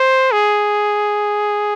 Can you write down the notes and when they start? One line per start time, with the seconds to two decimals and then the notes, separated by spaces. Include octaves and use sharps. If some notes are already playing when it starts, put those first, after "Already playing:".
Already playing: C5
0.32 G#4